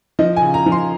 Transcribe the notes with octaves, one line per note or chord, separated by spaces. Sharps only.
F3 D#5
G#5
C#3
A#5
F3
C6